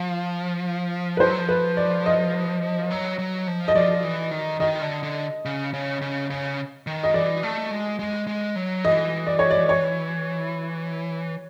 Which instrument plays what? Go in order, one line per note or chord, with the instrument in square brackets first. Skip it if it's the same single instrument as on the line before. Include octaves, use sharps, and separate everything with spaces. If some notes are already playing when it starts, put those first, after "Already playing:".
Already playing: [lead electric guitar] F3
[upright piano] B4
[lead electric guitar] F3 [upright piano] C5
[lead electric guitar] F#3
F3
[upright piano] B4
D5
D#5
[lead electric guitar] F#3
F#3
F3
[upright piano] D#5
[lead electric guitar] F3 [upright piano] D5
[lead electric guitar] E3
D#3
[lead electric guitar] D#3 [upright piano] D#5
[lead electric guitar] D3
D3
C#3
C#3
C#3
C#3
D#3
[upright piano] D#5
[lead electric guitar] E3 [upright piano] D5
[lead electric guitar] A3
G#3
G#3
G#3
F#3
[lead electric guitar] E3 [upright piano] D#5
[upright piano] D5
C#5
D5
C#5